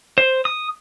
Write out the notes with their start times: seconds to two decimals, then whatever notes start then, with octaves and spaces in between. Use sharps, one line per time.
0.18 C5
0.45 D#6